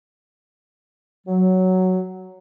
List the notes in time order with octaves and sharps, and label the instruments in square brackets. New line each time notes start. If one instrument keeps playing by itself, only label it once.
[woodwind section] F#3